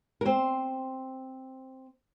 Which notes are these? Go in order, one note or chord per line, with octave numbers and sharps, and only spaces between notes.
A#4
C4 C5